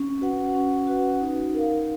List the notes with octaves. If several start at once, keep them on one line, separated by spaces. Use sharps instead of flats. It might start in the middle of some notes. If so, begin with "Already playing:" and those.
Already playing: C#4
F#4 B4 F#5
C#4
F#4 B4 F#5
D#4
A#4 F5